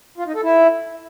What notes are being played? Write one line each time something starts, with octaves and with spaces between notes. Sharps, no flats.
F4
D#4
A4
E4